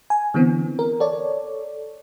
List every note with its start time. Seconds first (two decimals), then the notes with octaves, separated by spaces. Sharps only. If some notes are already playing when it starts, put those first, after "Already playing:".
0.10 G#5
0.34 D3 E3 B3 C4
0.79 A#4
1.00 A4 C#5 D5